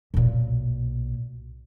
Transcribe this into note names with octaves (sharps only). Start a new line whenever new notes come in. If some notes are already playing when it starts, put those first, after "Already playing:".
B1 A#2